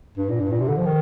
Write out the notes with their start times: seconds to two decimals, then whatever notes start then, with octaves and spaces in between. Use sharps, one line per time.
0.17 G2
0.29 A#2
0.40 G2
0.51 A#2
0.60 C3
0.68 D3
0.77 F3
0.85 D#3